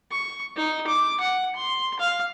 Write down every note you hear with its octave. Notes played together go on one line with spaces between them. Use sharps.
C#6
D#4
D6
F#5
C6
F5